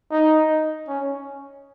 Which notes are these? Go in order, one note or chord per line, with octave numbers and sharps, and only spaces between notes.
D#4
C#4